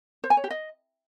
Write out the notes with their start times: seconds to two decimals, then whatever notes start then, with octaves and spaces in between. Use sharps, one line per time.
0.24 C5
0.30 G#5
0.37 C#5
0.44 G4
0.50 D#5